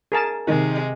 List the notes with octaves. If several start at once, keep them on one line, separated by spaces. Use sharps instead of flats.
G#4 A#4 A5
C3 D#3 G#3